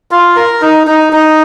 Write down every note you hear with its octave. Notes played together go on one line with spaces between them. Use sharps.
F4
A#4
D#4
D#4
D#4